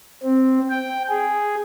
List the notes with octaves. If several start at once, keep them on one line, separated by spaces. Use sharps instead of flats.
C4
G5
G#4